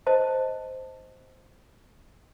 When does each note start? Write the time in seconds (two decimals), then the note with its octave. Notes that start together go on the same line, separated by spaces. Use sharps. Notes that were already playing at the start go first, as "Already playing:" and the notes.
0.07 C5 D#5 A5